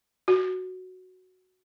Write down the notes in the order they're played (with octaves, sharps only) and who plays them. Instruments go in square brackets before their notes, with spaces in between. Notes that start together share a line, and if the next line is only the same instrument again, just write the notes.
[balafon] F#4